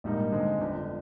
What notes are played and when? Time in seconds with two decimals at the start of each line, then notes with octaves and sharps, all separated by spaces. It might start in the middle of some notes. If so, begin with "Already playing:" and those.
0.04 A#1 G#2 G3 A#3 D#4
0.32 D3 G#3 C4 D#4
0.60 G1 F2 D3